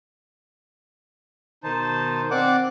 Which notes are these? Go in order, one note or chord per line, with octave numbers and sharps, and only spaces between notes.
B2 D#3 D#4 C5 A5
C4 D5 F#5 D6